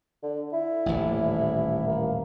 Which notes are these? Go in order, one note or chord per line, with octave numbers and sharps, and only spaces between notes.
D3
E4
D#1 A1
A#3